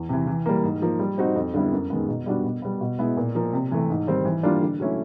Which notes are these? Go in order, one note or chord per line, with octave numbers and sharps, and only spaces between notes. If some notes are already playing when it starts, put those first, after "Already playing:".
Already playing: E2
C3 E3
E3
G3 A#3
G#2
F3 A#3
G3
C4 D#4 F#4
F2
D3 G3 B3 E4
F#2
D#3 G#3 B3
B2
G3 B3 D4 F#4
B2
G3 B3
B2
G#3 B3 E4
A#2
F3 A#3
C3
E3 A3
G#2
D#3 G3 C4
E3
G3 A#3 D4 F4
D3
F#3 A3 C#4 E4